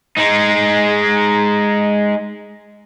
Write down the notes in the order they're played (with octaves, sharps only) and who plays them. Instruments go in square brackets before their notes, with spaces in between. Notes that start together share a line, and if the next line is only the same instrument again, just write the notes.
[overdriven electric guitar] G#3 D#4